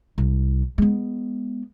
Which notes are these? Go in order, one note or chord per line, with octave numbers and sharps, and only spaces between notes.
C2
G#3 B3